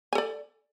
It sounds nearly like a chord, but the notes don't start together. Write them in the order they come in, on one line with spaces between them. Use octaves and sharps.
G#5 A4 D5